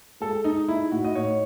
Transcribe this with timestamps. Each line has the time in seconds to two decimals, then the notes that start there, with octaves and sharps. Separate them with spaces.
0.20 G#3 A4
0.44 D#4
0.68 D#4 E4
0.92 A2 F#4
1.04 D#5
1.15 A2 C#5